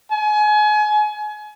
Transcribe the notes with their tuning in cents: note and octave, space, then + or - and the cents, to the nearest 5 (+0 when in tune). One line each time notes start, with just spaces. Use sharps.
G#5 +30